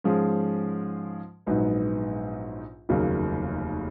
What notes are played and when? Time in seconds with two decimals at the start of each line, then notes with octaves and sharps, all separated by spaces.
0.04 G#2 F3 G#3 C#4 G#4
1.46 A#1 G#2 F#3 B3 D#4
2.89 F1 D#2 C#3 F#3 A#3